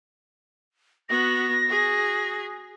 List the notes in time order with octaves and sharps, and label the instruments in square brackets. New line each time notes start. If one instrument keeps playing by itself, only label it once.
[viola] B3 F#4 [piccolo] A#6
[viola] F#4 G#4